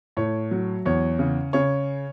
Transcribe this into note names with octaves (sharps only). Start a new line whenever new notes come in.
A2 C#5
F#3
E2 C#5
C#3
C#3 C#5